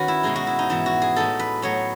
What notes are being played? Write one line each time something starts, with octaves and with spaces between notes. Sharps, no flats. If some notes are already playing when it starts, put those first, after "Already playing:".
Already playing: D#3 C#4 F#4 B4
E4
B2 G#3 D#4 G#4
F#4
E4
D#4
G#2 E3 B3 E4
F#4
G#4
A2 G#3 D#4 A4
B4
A2 F#3 B3 C#5